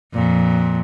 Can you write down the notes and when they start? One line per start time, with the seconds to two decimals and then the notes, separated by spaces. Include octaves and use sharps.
0.14 F2 A#2